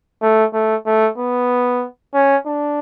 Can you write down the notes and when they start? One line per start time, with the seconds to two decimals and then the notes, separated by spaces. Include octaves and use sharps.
0.22 A3
0.53 A3
0.86 A3
1.18 B3
2.14 C#4
2.46 D4